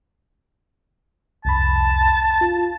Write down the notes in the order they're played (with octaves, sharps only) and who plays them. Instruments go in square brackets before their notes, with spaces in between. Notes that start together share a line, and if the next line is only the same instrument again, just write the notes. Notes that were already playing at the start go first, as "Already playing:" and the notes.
[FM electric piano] C2 F2 B5 [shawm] A5
[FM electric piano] F4